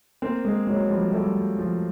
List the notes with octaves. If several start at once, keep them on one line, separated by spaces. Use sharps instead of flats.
A#3 C4
G#3 A#3
F#3 G#3
F3 G3
G3 A3
F3